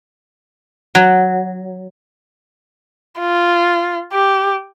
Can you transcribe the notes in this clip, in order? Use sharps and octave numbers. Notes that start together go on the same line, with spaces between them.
F#3
F4
G4